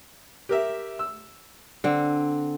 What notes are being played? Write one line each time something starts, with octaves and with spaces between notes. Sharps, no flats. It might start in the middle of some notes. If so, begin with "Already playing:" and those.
G4 A#4 E5
E6
D3 C4